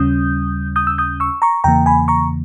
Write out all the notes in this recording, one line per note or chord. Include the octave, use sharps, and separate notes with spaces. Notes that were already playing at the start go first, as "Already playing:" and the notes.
Already playing: D#2 C#3 G3 C#4 D#6 G6
D#6 G6
E6
D#6 G6
C#6 E6
A#5 C#6
E2 C#3 E3 A#3 G5 A#5
G#5 B5
A#5 C#6